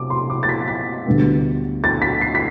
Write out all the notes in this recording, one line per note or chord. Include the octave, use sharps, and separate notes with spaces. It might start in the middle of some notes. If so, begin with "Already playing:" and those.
Already playing: C3 D6
C6
D6
A6
B6
B6
D2 D3 G3 B3
A6
B6
C7
B6